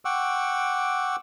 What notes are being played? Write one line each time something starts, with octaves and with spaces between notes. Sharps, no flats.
F#5 G5 C#6 D6 E6